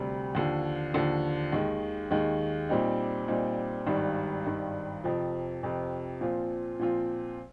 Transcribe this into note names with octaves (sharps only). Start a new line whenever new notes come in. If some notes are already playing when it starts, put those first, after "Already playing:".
Already playing: D2 C3 G3
D#2 D3 F3
D#2 D3 F3
D#2 D#3 G#3
D#2 D#3 G#3
A#2 G3 C4 D#4
A#2 G3 C4 D#4
G#1 G2 D#3 G3
G#1 G2 D#3 G3
F2 C3 F3
F2 C3 F3
A#2 F3 C4 F4
A#2 F3 C4 F4